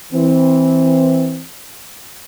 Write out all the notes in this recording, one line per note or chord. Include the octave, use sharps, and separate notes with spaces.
E3 C4